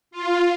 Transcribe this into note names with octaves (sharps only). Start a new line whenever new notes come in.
F4